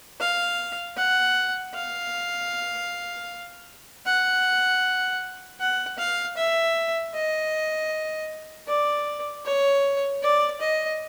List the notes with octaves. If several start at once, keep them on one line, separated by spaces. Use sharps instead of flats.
F5
F#5
F5
F#5
F#5
F5
E5
D#5
D5
C#5
D5
D#5